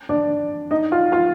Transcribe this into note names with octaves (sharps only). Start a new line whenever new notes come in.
D4 D5
D#4 D#5
F4 F5
F4 F5